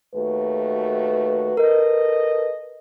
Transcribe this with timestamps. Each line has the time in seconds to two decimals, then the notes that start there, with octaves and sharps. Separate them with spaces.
0.14 D#2 A3 F#4 B4
1.57 A4 A#4 D#5